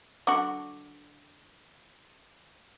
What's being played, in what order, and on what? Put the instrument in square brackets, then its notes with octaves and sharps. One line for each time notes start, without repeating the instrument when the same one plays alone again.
[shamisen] D3 F#4 [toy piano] D6